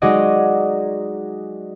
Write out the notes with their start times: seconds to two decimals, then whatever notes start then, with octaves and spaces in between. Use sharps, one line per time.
0.02 F#3 G#3 D#4 F#4 D5 D#5